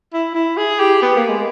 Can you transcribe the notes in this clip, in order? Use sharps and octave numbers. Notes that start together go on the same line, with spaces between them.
E4
E4
G#4
G4
B3
A#3
G#3